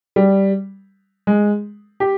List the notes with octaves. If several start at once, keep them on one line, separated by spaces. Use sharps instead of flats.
G3
G#3
G4